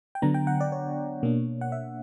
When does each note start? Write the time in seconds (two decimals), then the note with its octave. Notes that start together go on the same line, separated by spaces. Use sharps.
0.15 G5
0.22 D3 F#3 B3 D4 A#5
0.34 G5
0.47 F#5
0.61 D5
0.72 C#5
1.23 B2 A#3 D4
1.61 F#5
1.72 E5